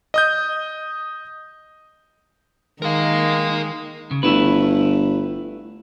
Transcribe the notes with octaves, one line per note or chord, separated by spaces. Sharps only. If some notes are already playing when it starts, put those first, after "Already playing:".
D#5 D#6 G6
D#3 G#3 A#4 F5
C#3
G1 A3 E4 B4